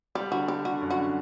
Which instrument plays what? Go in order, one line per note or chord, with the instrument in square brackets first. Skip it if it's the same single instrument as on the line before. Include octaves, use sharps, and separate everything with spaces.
[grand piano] G3 [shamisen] G4
[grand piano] D3 [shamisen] F#4
[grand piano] G3 [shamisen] G4
[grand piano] D3 [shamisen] F#4
[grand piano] F#2
[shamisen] F#4
[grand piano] D3